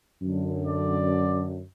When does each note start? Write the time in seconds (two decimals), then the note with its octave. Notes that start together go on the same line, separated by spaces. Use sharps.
0.22 F#2 D3
0.66 D5